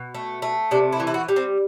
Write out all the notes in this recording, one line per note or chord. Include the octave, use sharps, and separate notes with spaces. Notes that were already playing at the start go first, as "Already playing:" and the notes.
Already playing: B2
A3
A3
C3 D4
E4
E3
E4
F#4
G3
C4